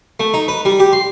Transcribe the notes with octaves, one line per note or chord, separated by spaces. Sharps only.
A3
D#4
B4
G3
G4
C6